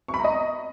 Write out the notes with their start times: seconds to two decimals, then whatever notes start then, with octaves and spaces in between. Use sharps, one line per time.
0.08 C#6
0.14 B5
0.19 A#5
0.24 D#5